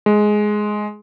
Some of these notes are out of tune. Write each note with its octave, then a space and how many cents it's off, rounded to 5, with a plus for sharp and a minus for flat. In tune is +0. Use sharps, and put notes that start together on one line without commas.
G#3 +10